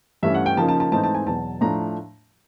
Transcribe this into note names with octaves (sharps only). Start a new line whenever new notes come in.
G2 E3 A3 C#4 E5
F#5
G5
C#3 F3 A#3 D#4 A5
A5
A5
G#2 E3 A3 C4 D#4 A5
A5
G#5
E2 B2 F#3 A5
A2 F3 A3 D4 A#5